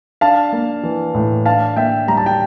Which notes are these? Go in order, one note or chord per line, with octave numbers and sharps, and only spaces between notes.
D4 F5 A5
A#3
E3
A2
D4 F5 A5
A#3 E5 G5
G3 A#5
A5
G5